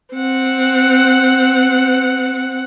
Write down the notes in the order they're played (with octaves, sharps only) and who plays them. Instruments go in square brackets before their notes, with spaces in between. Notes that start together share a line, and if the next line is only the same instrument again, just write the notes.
[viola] C4 F#5